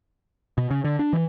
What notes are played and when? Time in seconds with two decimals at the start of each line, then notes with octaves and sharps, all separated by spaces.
0.58 B2
0.71 C#3
0.84 D3
0.99 D4
1.13 E3